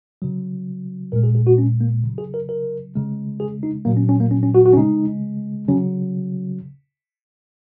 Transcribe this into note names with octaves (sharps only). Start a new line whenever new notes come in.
C#3 F#3
A#2 G#3 A#4
G#4
G#4
F#4
C#4
A#3
C#3 F#3
G#4
A#4
A#4
C#3 G#3
G#4
D#4
A#2 F#3 A#3
C#4
C#4
A#3
C#4
C#4
F#4
F#4
C#4
C#3 G#3 D#4
C#3 F#3 C#4